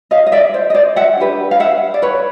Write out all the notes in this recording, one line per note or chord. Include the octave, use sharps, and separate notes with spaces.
D#5 F5
D#5
D5 E5
C5
D#5
C5 D5
E5 F#5
D4 G4 B4
F5
E5 F#5
D5
B4 C#5